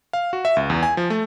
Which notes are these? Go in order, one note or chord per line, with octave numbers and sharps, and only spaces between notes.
F5
F#4
E5
C#2
E2
G#5
F3
A3